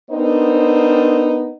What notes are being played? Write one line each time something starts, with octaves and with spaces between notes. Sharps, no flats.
B3 C4 D4 D#4 A#4 C5